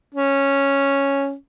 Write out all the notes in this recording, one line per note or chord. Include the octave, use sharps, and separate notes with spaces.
C#4